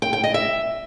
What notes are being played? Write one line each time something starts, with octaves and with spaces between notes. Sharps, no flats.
G5
G5
D#5
E5